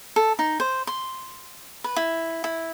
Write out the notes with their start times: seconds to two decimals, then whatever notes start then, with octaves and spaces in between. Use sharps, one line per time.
0.16 A4
0.39 D#4
0.60 C5
0.87 C6
1.84 B4
1.96 E4
2.44 E4